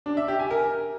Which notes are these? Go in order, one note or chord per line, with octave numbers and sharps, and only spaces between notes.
D4
E5
G4
G#5
A#4